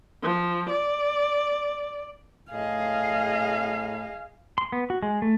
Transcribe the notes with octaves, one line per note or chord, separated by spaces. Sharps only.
F3
D5
A2 G#4 D#5 F5
C6
B3
F#4
G#3
A3